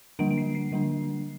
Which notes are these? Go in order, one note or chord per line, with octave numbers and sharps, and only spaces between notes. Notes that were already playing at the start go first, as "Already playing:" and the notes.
D3 G3 A#3 D4 D7
D7
C7
C7
D3 G3 A#3 D4